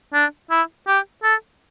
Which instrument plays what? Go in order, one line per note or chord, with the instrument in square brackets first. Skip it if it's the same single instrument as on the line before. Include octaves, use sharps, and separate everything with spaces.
[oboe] D4
E4
G4
A4